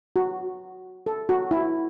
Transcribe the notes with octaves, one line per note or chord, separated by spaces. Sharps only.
F#4
A4
F#4
E4